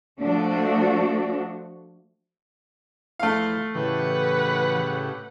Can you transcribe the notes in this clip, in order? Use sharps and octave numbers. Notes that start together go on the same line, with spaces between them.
F3 A3 D4 F#4
E2 F3 A3 F5
A2 C#3 E3 G4 B4 F#5